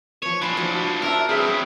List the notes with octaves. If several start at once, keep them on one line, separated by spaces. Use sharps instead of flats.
F3 B4 C#5
D4 C5 F5 G#5 B5
F3 E4 F#4
D4 A#4 E5 A5 C6
F#3 C4 G#4 B4 E5